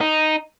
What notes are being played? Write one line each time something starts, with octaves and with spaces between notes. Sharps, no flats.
D#4